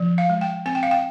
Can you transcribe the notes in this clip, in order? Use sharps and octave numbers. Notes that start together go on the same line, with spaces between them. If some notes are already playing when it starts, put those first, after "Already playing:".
Already playing: F3
F5
G#3
G5
C4 G#5
G5
F5
G5